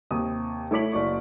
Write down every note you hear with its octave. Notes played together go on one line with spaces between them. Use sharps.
D#2 C3 D#6
A3 E4 C#5 D6 B6 F#7
F#1 E4 D5 C#6